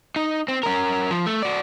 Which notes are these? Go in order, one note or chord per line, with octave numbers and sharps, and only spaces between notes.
D#4
C4
C#4 A#4
F3
A3
F#4 D5